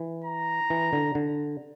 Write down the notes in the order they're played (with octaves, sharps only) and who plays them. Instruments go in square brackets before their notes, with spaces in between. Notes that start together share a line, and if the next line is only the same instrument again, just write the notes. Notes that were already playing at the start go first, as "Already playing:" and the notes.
Already playing: [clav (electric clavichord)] E3
[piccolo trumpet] A#5
[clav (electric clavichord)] E3
D3
D3